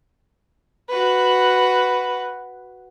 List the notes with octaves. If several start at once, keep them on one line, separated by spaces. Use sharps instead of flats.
F#4 B4